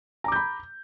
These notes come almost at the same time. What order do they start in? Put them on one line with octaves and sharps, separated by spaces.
A#5 D6 G6 B5